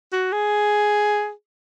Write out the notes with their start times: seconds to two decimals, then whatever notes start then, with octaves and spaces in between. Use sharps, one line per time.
0.13 F#4
0.32 G#4